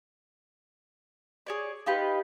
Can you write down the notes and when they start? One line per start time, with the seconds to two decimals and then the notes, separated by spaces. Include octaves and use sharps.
1.47 G#4 C#5 D5
1.86 D#4 F4 G4 B4